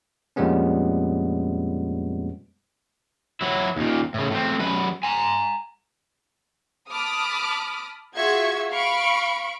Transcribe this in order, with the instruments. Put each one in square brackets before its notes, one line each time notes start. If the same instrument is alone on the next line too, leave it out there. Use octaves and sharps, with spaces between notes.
[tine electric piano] F2 A#2 G3 G#3 B3 C#4
[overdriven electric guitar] F#3 E4
D#2 A#2
A2 C#3
A2 C4
F#2 B4
G#5 A#5
[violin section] A5 B5 D6 D#6 F6
F4 F#4 G#4 E5 C#6 G#6
F5 B5 C#6 D7